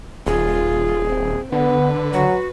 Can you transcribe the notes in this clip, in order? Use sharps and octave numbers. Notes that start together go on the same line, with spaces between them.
D#1 F4 G#4
C4
D3 B3 B4
F#3 F#4